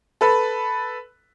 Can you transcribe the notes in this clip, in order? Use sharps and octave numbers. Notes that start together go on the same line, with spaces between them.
A4 B4